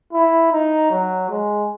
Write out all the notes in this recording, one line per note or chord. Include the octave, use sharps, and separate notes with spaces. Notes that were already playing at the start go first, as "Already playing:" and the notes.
E4
D#4
F#3
G#3